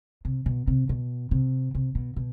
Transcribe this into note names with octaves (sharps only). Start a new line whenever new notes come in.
C3
B2
C3
B2
C3
C3
B2
B2